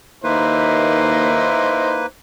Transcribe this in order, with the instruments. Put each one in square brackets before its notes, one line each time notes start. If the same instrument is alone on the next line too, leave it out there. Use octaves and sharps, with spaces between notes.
[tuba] D#2 [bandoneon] A#3 B4 [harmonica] D#4 E4 C5